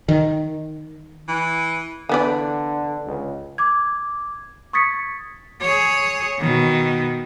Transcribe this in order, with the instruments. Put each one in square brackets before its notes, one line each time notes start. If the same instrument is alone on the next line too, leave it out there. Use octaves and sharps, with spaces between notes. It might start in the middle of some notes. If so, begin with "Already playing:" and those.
[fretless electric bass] D#3
[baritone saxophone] E3
[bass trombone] D3 [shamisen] E3 B3 D5
[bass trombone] C#2
[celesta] D6 G#6
C#6 D#6 G#6 A6 B6 C#7
[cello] G#4 C#5
B2 D#3